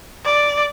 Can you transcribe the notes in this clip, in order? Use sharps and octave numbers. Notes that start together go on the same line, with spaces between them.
D5